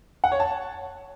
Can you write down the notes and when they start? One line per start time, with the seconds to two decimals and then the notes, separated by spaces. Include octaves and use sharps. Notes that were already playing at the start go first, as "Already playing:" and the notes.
0.24 F#5
0.32 C#5
0.40 A5